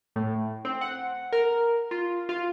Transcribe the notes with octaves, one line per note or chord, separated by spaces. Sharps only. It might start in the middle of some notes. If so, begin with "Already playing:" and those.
A2
C4
F#5
A#4
F4
F4